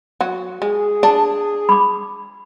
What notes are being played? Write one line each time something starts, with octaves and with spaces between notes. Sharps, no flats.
F#3 F#4
G#3 G#4
D4 A5
B5 D6